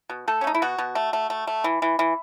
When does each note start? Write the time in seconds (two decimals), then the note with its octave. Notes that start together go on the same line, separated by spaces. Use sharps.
0.09 B2
0.28 A3 A4
0.41 C#4
0.44 A3 D#4
0.54 E4
0.62 B2 F#4
0.78 B2
0.95 A3
1.13 A3
1.30 A3
1.47 A3
1.64 E3
1.82 E3
1.99 E3